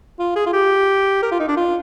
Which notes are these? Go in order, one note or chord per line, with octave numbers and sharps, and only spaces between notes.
F4
G#4
F4
G4
A#4
F4
D#4
D4
F4